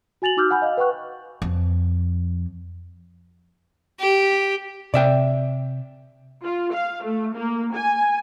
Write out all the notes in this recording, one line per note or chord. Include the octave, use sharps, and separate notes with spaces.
F#4 G#5 A6 F7 F#7
D#4 F#4 D6 E6 F6 G6
F#5 G#5 B5 G6
D#5 F5
B4 F#5 G5 C#6 F#6
F2
G4
C3 D5 E5 G5
F4
F5
A3
A#3
G#5